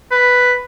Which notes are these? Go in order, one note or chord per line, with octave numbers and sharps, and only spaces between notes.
B4